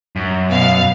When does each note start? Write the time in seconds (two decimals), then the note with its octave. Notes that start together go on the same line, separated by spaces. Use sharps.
0.16 F#2
0.50 B2 F5